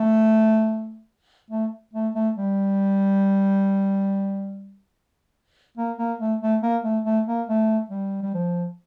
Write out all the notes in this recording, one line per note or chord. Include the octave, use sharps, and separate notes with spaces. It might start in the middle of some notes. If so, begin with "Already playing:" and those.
Already playing: A3
A3
A3
A3
G3
A#3
A#3
A3
A3
A#3
A3
A3
A#3
A3
G3
G3
F3